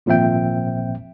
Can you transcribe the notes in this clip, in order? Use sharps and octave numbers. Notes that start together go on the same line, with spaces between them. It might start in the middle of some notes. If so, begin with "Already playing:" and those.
G#1 A#2 F3 C4 E5 G5